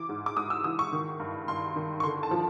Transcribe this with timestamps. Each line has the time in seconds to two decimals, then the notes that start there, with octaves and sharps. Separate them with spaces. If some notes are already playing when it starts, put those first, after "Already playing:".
Already playing: E3 D6
0.09 G#2
0.26 D6
0.37 G#2 D#6
0.50 E6
0.64 E3 D#6
0.79 C#6
0.92 D#3
1.20 G2
1.48 G2 C6
1.76 D#3
2.00 C#6
2.04 D3 C6
2.23 A5
2.31 F3